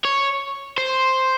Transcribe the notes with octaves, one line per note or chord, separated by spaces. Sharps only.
C#5
C5